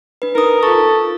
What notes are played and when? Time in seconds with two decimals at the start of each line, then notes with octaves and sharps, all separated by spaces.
0.22 D4 B4
0.35 D#4 A#4 D#6
0.63 F4 A4 C#6